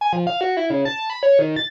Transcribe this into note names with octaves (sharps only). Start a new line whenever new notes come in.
G#5
F3
F5
F#4
E4
C#3
A5
B5
C#5
D#3
A6